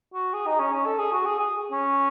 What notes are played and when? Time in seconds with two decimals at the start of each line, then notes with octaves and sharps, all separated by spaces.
0.14 F#4
0.34 G#4
0.47 D#4
0.59 C#4
0.73 C#4
0.86 A4
0.99 G#4
1.12 F#4
1.26 G#4
1.39 G#4
1.72 C#4